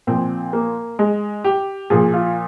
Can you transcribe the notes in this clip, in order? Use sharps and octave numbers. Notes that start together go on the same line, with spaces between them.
A#2 F3 C4
A#3
G#3
G4
A#2 F3 G#4
F4